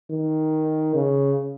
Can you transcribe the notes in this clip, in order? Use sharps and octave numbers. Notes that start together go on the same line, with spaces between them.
D#3
C#3